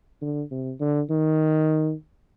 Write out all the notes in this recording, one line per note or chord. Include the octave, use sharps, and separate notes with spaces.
D3
C3
D3
D#3